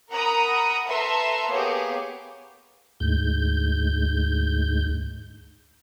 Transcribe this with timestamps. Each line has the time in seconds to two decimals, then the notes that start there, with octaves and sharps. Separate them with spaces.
0.11 A#4 F#5 A#5 B5 D#6
0.88 A4 B4 E5 A#5 C6
1.49 A#3 B3 G4 G#4 C#5
3.00 D2 G#2 G6